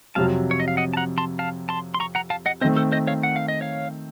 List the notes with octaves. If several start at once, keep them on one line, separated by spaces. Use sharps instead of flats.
F2 C3 F#3 F5 A5
C#5
D#5
F5
D#5 F#5
A5
F#5 A#5
A5 C6
F5 A5
A5 C6
C6
A#5 C#6
F#5 A#5
F5 A5
D#5 F#5
D#3 A3 C4 C5 D#5
A4 C5
C5 D#5
C#5 F5
F#5
F5
D#5
C#5 F5